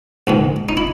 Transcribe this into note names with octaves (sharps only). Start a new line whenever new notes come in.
A#1 G#2 D#3
D#4
E4